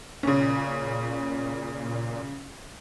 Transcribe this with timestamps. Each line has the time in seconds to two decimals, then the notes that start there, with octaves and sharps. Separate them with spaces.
0.23 A#2 C#3 C#4